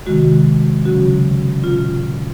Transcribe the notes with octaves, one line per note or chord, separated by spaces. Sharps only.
C3 D#3 G#3 F#4
C#3 F#3 C#4 F#4
A#2 F#3 C#4 F4